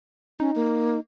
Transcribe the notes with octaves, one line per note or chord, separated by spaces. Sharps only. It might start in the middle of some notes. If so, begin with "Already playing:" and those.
C#4 D#4
A#3